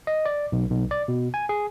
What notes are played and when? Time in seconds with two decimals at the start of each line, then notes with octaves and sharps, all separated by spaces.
0.07 D#5
0.26 D5
0.52 B1
0.70 B1
0.91 D5
1.08 B2
1.34 G#5
1.49 G#4